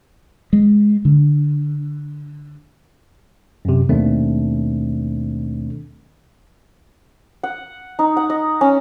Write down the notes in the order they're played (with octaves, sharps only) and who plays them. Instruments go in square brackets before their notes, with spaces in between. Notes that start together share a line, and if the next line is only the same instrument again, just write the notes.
[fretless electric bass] G#3
D3
[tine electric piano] F#2 C3
D#2 B2 D#3 A3 C4 D4
[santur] F#5
D#4
F#5
D#5
C#4